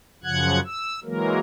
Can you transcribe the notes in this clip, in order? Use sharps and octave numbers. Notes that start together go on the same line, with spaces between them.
F#2 C#3 F3 F#5 F#6 G#6
E6
E3 F#3 G#3 A#3 A#4